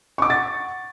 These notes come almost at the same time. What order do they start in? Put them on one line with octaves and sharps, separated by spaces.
C#6 D6 F#5 A6